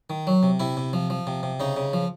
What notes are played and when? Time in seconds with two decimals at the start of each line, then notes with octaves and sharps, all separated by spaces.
0.10 D#3
0.27 F#3
0.43 C3
0.60 C3 E4
0.77 C3
0.93 F3
1.10 F3
1.27 C3
1.43 C3
1.60 C#3 D#4
1.77 C#3
1.93 F3